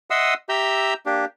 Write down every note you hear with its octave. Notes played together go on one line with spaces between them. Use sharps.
D#5 E5 F#5 C6 D#6 E6
G4 E5 A#5 E6 G6
A#3 D4 G4